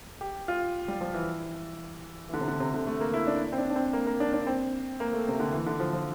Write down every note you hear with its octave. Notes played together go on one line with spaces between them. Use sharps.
G4
F4
G3
F3
E3
E3
D3
C3
D3
C3
D3
A3
A#3
E4
D4
C4
D4
D4
C4
A#3
A#3
D4
D4
C4
A#3
A3
C3
D3
E3
D3
F3
F3